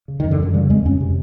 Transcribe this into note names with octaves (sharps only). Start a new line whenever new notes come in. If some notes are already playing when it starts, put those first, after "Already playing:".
C#3
D#3
F#2
D3
F#2 D#3
C#3 G3
F2 G#3
F2 C#4
C3